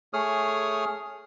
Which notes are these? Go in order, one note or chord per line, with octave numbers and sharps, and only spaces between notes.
A3 G#4 C#5 D#6 F6